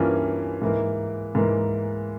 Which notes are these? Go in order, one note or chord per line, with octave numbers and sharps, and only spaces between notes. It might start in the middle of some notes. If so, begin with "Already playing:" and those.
Already playing: G2 E3 A#3 C#4 F4
G#2 E3 A#3
G#2 E3 A#3